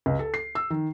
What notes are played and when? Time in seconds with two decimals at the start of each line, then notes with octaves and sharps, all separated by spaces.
0.06 C#2
0.19 A4
0.34 C7
0.55 E6
0.70 D#3